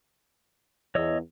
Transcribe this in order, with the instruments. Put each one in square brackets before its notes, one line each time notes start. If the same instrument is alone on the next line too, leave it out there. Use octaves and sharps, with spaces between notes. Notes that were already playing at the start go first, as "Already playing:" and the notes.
[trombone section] E2 [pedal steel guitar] C#5 D#5 E6